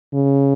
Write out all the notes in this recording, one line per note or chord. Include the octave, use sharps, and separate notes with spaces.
C#3